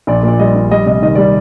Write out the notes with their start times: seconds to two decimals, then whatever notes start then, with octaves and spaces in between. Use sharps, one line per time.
0.07 A#1 D5
0.23 A#2
0.28 D5
0.39 G3 D#5
0.55 A#1
0.71 G3 D#5
0.86 C3 D#5
1.02 D#3 D#5
1.15 G3 D5